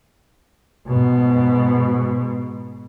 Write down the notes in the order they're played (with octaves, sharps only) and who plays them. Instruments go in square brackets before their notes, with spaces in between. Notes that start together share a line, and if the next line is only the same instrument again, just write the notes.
[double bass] G#2 B2